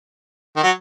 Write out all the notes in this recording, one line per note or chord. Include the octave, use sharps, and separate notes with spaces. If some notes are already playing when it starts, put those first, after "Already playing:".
D#3
F#3